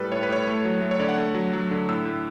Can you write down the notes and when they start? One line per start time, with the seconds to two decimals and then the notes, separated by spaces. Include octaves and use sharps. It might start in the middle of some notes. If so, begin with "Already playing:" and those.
Already playing: A2 G3 A4 B4
0.12 A2 C#5
0.23 B4
0.29 A2 C#5
0.47 A3
0.65 F#3
0.81 A3
0.91 C#5
0.99 D3 D5
1.09 F#5
1.18 A3
1.35 F#3
1.53 F#3
1.71 D3
1.89 A2 E6
2.05 A2